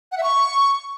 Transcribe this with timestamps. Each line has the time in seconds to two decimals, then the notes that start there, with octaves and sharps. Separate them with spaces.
0.12 F#5
0.18 E5
0.23 C#6